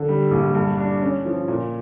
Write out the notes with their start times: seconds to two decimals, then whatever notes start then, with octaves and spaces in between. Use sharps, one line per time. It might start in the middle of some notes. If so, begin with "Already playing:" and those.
Already playing: D3
0.09 G3
0.31 A#1
0.55 G2
0.78 D4
1.02 C#4
1.25 F3
1.48 A#2